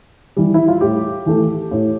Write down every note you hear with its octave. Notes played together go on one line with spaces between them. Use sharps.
E3 G3
E4
F4
A2 G4
E3 A3
A2